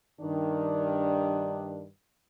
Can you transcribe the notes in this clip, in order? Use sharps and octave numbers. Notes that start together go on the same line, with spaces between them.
G2 D#3 D4